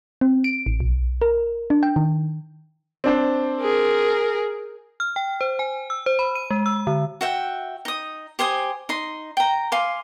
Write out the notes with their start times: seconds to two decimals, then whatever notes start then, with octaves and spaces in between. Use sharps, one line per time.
0.21 C4
0.44 D7
0.66 A1
0.80 B1
1.22 A#4
1.70 D4
1.83 G5
1.96 D#3
3.04 C4 D4 C5
3.61 G#4 A#4
5.00 F6
5.16 G5
5.41 C5
5.59 G#5
5.90 E6
6.06 C5
6.19 B5
6.35 D#7
6.51 G#3
6.66 E6
6.87 D3
7.21 F#4 E5 G5
7.85 D#4 D#6
8.39 G4 C5 G#5 D#6
8.89 D#4 C6
9.37 G5 A#5
9.72 F5 G#5 C6 D6